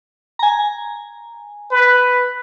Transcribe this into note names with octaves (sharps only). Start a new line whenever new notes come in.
G#5 A#5
B4